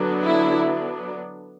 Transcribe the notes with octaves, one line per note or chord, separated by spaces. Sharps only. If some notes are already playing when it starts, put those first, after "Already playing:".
Already playing: D3 F#3 B3 D4
E4